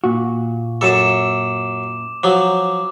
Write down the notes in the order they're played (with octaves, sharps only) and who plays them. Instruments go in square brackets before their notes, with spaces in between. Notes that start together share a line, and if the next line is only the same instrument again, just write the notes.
[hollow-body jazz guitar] A#2 F#4
[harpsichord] F#2 A4 [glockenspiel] D6 E7
[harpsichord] F3 F#3 [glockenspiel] D6